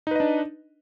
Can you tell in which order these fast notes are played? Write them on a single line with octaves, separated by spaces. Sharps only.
D#4 B4 D#5 D4